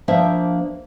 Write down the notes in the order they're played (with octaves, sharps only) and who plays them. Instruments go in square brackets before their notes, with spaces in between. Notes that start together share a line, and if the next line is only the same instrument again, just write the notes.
[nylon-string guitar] F3 A#3 D4 C5 E5 F5